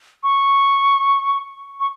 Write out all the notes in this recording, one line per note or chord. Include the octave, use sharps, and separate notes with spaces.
C#6
C#6